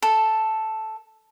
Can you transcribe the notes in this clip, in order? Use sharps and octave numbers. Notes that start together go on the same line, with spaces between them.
A4